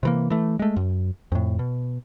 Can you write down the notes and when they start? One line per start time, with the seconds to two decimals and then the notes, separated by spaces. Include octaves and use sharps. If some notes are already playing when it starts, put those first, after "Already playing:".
0.03 C3 E3 A#3
0.30 E3 A3
0.59 G#3 A3
0.76 F#2
1.32 F2 A2
1.59 B2